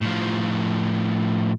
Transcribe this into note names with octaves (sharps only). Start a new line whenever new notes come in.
A2 F3